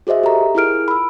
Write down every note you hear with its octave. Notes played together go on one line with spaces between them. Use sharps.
F#4 G#4 C5 D#5 E5
G4 A4 A#5
E4 F4 G#4 A#4 F6 D7
B5 E6